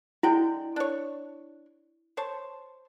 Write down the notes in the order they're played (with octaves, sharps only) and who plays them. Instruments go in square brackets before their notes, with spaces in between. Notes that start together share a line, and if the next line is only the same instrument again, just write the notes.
[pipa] D3 G#3 G5 [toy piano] E4
[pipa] D4 C#5
C5 C#5 A5